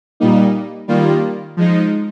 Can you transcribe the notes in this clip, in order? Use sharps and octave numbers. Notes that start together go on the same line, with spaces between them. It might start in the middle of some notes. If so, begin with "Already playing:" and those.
A#2 G3 A#3 D#4
D#3 G3 A#3 F4
F3 G#3 D#4